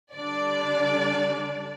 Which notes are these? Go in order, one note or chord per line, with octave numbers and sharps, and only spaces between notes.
D3 G3 D4 D5